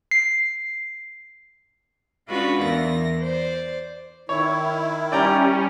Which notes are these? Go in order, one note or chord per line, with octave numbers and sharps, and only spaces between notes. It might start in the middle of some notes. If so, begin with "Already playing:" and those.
C7
G#3 C#4 D4 F4 F#4 B4
E2 E3 A#4 A#6
C5 D5
D#3 E4 C#5
G3 C#4 D5 G5 A#5